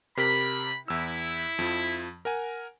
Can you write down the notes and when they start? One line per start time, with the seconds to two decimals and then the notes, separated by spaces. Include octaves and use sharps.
0.17 C3 G4 A#4 B5
0.88 E2 E4 E6
1.59 F2 F3
2.25 A#4 F#5 G#5